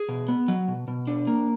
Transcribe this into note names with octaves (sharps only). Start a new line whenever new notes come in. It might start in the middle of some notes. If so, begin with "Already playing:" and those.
Already playing: G#4
B2
B3
F#3
B2
B2
D4
A#3